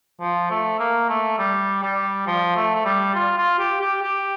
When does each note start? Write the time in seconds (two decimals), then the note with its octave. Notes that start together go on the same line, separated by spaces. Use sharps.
0.20 F3
0.50 A3
0.79 A#3
1.09 A3
1.39 G3
1.82 G3
2.27 F3
2.56 A3
2.75 A3
2.85 G3
3.15 F4
3.37 F4
3.59 G4
3.81 G4
4.03 G4